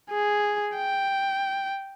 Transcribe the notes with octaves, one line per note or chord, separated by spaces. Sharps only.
G#4
G5